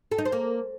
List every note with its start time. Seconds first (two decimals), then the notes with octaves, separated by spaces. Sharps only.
0.11 A4
0.18 D#4
0.25 C5
0.32 A#3